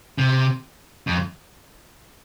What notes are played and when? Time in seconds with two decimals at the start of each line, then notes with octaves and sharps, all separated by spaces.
0.18 C3
1.07 F2